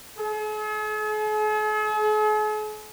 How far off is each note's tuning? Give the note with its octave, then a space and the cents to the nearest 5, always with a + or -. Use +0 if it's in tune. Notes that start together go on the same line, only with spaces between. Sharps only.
G#4 +45